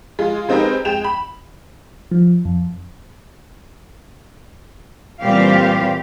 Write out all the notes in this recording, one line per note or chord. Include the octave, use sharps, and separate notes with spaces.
G#3 F4
G#3 C4 D#4 G4 A#4 B4
G#3 G5 E7 F7
B5
F3
F2
A#2 E3 G3 C4 G4 F5